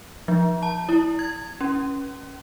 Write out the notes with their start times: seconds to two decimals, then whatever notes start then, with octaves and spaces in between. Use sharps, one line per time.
0.28 F3
0.63 A5
0.89 E4
1.19 G#6
1.60 C#4